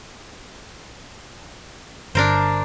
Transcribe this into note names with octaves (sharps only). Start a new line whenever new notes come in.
G1 D4 A#4 C5